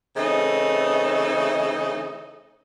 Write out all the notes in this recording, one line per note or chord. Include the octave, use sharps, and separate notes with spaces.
C#3 E3 A3 C4 D#4